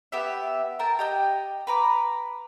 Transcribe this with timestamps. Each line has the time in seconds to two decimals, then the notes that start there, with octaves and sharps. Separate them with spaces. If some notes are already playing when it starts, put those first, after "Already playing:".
0.12 B3 G4 E5
0.79 A#4 G5 A5
0.99 G4 D#5 G5
1.67 B4 A#5 D6